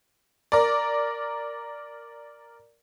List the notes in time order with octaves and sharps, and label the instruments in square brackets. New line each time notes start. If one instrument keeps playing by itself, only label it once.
[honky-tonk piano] A#4 D5